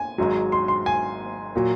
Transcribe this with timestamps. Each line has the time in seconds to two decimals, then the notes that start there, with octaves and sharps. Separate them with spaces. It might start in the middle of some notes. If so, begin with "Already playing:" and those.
Already playing: G#5
0.18 G#1 G#2 F#3
0.52 C6
0.68 C6
0.86 G#5
1.55 A#2 F#3